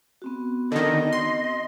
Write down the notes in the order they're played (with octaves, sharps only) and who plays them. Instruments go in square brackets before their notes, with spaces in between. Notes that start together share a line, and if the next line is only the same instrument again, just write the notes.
[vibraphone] B3 C4 F#4
[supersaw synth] D3 D#3 [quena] D#5
[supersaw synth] C6